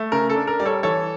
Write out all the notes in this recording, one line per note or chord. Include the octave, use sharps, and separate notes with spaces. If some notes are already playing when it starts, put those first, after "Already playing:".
Already playing: A3
C#3 A#4
A4
D4
A#4
G3 D5
A4 C#5
E3 A4 C#5